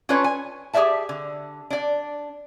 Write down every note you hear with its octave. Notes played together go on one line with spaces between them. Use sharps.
C#4 D4 F4 A4 B4 C#5
G#5
G4 G#4 B4 D5 E5 A5
D3
D4 D5